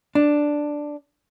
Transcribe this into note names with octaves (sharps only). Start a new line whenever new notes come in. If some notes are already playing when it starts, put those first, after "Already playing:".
D4